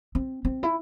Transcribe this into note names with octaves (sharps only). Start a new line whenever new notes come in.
C4
C4
E4